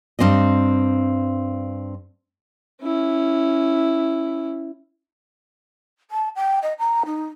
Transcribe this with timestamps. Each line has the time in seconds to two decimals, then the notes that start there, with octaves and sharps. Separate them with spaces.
0.19 G2 D#3 C4 D4 D#5
2.82 C#4 E4
6.10 A5
6.36 G5
6.62 D#5
6.79 A#5
7.05 D#4